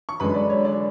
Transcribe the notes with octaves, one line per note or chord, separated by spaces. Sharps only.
C#6
F#2 D3 G#3 B4 B5
D5
C#5
D5